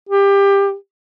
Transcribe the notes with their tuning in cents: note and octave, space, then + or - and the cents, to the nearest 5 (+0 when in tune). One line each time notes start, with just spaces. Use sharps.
G4 +20